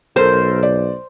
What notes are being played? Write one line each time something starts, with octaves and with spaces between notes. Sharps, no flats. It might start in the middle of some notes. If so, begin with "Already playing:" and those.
B1 A4 A#4 C5
D5